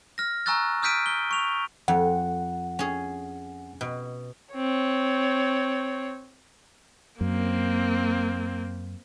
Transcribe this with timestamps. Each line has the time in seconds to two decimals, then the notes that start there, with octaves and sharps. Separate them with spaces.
0.18 F6 A#6
0.46 G#5 A#5 C#6 E6 F#6 A6
0.82 D#6 F6 G6 B6 D7 D#7
1.06 G7
1.31 C#6 F7
1.88 F2 F#5
2.79 C#4 G#4
3.81 B2
4.55 C4 C#5
7.21 F#2 A#3 C4